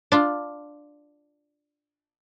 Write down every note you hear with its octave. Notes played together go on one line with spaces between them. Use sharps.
D4 F4